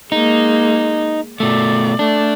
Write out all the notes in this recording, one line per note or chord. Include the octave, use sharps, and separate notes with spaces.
G#3 A#3 D#4
B2 A3 D5
A3 D4